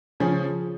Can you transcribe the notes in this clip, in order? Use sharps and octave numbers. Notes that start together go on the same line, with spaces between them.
C#3 F3 C#4 G#4